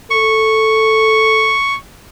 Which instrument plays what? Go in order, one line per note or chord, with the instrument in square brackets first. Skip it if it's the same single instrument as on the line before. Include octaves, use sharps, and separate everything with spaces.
[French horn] A4 [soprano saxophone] C#6